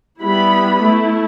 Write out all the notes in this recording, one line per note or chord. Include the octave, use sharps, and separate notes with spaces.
G3 B3 E4 B5
A3 E4